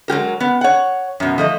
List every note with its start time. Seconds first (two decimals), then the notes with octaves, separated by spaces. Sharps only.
0.08 F#3 G#3 G4 A#4
0.40 B3
0.61 C#5 F#5
1.20 F#2 B2
1.38 F3 A3 D#5